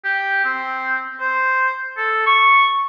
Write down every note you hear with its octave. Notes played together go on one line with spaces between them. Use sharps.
G4
C4
C5
A4
C#6